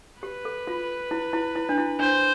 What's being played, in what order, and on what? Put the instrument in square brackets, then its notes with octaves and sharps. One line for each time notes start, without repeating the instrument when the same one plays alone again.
[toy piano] G4 [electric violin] B4
[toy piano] A4
F4
E4
E4
E4
D4
E4
[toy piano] D4 [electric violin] C5